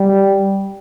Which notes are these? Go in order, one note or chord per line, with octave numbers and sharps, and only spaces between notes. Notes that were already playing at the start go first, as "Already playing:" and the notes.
Already playing: G3